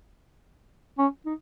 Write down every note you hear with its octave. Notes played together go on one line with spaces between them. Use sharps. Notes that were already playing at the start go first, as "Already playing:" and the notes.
C#4
D#4